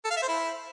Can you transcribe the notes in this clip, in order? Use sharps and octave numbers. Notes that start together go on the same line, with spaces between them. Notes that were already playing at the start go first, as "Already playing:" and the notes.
A4
F5
E5
C5
E4